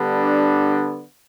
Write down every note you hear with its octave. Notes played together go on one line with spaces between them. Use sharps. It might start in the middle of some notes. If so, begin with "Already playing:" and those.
Already playing: D3 G3 B3 D4